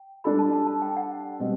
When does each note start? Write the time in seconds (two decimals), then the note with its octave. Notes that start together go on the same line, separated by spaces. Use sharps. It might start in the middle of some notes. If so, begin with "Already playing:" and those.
Already playing: G5
0.24 G3 D4 A4 B5
0.39 A5
0.53 A5
0.67 A5
0.82 G5
0.96 F#5
1.39 B2 G3 C4